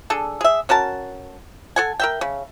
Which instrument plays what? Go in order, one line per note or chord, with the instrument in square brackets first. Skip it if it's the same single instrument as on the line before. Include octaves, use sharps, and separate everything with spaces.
[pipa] D4 G#4 A4
G#4 E5
C#4 F#4 A#4 A5
A4 F#5 G#5
A#4 E5 G5
C#3